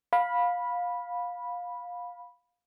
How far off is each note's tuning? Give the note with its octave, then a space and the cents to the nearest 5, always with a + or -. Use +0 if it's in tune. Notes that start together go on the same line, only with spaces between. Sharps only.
F5 +20 B5 -10